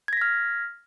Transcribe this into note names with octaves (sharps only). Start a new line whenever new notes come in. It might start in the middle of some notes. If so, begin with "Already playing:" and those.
F6 G#6 A#6 B6